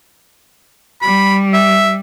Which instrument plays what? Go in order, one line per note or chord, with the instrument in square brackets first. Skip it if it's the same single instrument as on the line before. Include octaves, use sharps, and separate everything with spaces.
[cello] G3 [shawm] B5
[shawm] E5